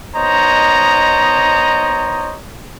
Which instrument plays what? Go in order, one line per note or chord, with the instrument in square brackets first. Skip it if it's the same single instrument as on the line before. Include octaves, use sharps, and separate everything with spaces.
[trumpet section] B3 D#4 C5 C#5 D#5 A#5